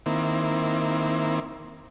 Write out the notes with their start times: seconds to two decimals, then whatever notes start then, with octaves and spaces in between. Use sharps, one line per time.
0.06 D#3 A#3 C4 E4